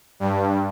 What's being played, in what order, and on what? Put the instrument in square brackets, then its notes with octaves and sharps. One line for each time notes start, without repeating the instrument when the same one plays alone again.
[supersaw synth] G2